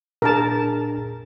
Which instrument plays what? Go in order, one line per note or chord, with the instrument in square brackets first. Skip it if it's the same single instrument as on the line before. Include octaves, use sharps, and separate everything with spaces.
[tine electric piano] A#2 D4 G#4 [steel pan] A#4 A5